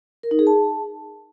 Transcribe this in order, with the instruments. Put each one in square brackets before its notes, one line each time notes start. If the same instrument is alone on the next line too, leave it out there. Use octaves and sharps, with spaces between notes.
[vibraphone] A#4
D#4
G#4
A5